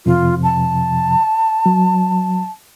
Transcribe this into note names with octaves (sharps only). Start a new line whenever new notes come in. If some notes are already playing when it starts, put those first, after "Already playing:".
F2 C3 F3 F4
A5
F#3